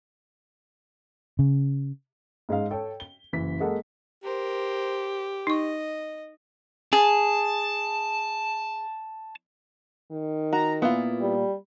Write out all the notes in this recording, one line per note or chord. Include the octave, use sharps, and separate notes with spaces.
C#3
G#2 G#3 D#4 F5
A4 C#5 G5
G7
F#1 E3 B6
G#3 A#3 G#4 A4 D#5 F#5
G4 A#4 C5
D#4 D#5 C#6
G#4 A5
D#3
F#4 A#5
A#2 B3 E4 F4
G3